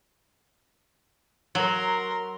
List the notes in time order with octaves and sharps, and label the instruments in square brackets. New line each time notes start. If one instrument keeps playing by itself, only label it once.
[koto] F#3 [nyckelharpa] A#4 C6